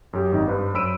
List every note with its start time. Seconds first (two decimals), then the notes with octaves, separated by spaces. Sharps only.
0.13 F#2 G4
0.32 G#1 D#4
0.47 G2 B4 C5
0.74 F#2 C5 B5 E6 D7 D#7